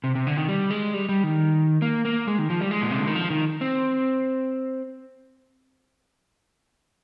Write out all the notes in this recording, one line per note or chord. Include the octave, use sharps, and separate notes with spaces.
C3
C3
D3
D#3
G3
G#3
G3
G3
D#3
A#3
A#3
G#3
D#3
F3
G3
G#3
A#2
C3
D3
D#3
F3
D#3
C4